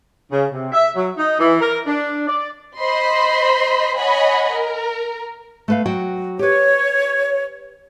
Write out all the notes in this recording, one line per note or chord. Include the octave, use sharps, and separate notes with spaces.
C#3
C3
E5
F#3
D#4
E3
A#4
D4
D5
C5 D#5 B5 C6
C#5 D#5 F#5 G#5 B5
A#4
A3 B4 F5
F#3 F#4 G5
G4 B4 C#5